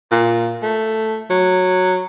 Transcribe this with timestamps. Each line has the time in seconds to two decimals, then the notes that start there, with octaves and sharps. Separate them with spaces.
0.11 A#2
0.62 A3
1.30 F#3